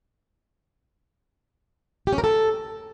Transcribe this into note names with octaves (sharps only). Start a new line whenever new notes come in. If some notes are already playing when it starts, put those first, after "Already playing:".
G4
C#4
A#4
A4